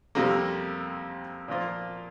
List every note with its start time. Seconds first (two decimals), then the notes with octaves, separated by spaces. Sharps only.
0.15 F2 C3 G3 A#3
1.48 A#2 F3 A#3 F4